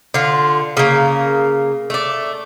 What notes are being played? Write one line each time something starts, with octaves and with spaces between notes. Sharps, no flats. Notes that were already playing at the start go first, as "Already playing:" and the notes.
D3 F4
C#3 A#3
A3 D5